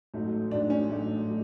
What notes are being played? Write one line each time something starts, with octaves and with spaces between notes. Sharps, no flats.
A1 G#2 F#3 A3
A1 G#2 F#3 A3 D4
C#4
A1 G#2 F#3 A3
F#3 A3